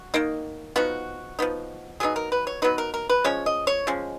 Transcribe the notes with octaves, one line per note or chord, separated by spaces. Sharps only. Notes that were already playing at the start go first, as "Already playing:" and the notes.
Already playing: F#4
D#3 A#3 D#4
F3 B3 D#4 F#4
F3 B3 D#4
F#3 B3 D#4 G#4
A#4
B4
C#5
F#3 B3 D#4 B4
A#4
A#4
B4
F3 G#3 C#4 C#5
D#5
C#5
F3 G#3 C#4